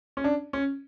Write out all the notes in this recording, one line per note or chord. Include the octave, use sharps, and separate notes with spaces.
C#4
D4
C#4